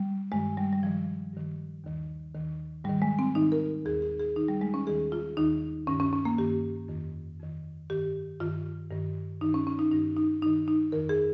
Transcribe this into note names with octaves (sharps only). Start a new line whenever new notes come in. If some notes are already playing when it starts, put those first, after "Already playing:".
Already playing: G3
G2 D#3 G#3
G3
G3
G2 D#3 F3
G2 D#3
D#2 D#3
D#2 D#3
G#2 D#3 G3
G#3
C4
G#2 D#3 D#4
A#4
D#2 D#3 G#4
G#4
G#4
D#2 D#3 D#4
G3
G#3
C#4
D#2 D#3 G#4
F4
D#2 D#3 D#4
G2 D#3 C#4
C#4
C#4
A#3
G2 D#3 G4
F2 D#3
F2 D#3
G2 D#3 G4
G2 D#3 F4
G2 D#3
G2 D#3 D#4
C#4
C#4
D#4
G2 D#3 D#4
D#4
G2 D#3 D#4
D#4
F2 D#3 A#4
G#4